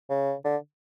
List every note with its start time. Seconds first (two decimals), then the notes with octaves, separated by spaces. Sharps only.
0.09 C#3
0.44 D3